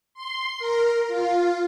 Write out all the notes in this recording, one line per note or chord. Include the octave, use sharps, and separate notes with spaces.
C6
A#4
F4